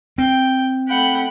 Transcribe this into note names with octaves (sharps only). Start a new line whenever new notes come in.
C4 G5
A3 F#5 G5 B5